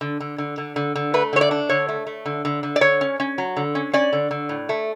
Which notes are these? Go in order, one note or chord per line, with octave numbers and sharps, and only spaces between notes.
D3
D3
D3
D3
D3
D3
A3 B4
D3 C#5
D5
D4
D3 C#5
A3
A3
D3
D3
D3
D5
D3 C#5
C#4
C#4
F#3
D3
C#4
C#4 D5
D3
D3
A2
A3